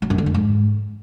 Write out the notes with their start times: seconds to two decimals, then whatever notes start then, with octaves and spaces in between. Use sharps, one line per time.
0.02 F#3
0.10 F#2
0.18 D3
0.26 F2
0.34 G#2